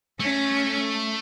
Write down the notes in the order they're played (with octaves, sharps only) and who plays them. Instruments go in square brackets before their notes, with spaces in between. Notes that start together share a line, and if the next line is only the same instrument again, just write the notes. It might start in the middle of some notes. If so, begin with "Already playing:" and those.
[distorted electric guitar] A3 [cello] C#4